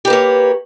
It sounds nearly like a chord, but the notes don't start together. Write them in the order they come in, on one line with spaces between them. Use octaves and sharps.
G4 B4 A#3 C#5